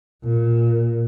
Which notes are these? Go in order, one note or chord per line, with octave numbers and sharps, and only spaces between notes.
A#2